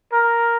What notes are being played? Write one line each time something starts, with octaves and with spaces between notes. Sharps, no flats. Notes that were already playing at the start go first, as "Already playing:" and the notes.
A#4